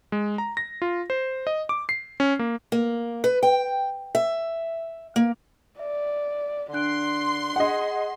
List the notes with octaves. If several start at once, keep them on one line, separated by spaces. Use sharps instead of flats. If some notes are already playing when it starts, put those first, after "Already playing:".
G#3
A#5
A#6
F4
C5
D#5
D6
C7
C#4
A#3
A#3
B4
G5
E5
A#3
D5 E5
D3 D4 C6 F#6 D7
G#4 D#5 F#5